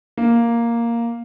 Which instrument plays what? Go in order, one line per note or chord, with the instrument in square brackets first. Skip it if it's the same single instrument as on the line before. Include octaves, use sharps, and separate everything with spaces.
[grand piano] A#3